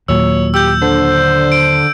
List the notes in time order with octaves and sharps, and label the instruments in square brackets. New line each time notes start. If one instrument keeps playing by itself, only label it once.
[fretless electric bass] D#2 A#2 F#3 [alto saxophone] C#5 [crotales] E6
[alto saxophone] G4 [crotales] E6 G6
[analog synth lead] D3 [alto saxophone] C5
[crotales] D7